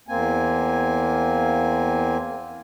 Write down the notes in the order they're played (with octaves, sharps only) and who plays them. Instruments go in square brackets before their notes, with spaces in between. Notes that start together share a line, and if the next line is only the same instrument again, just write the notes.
[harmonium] E2 A#3 C4 G#5